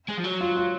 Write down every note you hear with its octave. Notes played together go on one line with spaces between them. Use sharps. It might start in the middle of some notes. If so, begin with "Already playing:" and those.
G#3
F3
F#3
F4
F4